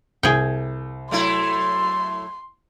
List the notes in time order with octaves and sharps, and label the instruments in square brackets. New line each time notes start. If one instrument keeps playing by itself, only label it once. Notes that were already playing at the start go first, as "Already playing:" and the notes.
[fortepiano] C2 [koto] G#4 G5
[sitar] F#3 A3 E4 [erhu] C6